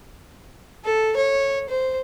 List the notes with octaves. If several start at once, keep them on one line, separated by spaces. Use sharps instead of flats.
A4
C#5
C5